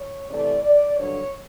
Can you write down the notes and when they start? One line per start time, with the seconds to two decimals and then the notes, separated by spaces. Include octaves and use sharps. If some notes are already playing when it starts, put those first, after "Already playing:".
Already playing: C#5
0.29 C3 E3 A3 D5
0.63 D5
0.96 G2 D3 F#3 C#5